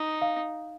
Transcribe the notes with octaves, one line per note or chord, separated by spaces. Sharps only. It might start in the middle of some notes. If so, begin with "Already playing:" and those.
Already playing: D#4
F5